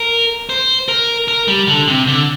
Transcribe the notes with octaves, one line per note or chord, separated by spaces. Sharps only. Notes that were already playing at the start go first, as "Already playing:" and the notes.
Already playing: A#4
C5
A#4
A#4
G3
D3
C3
D3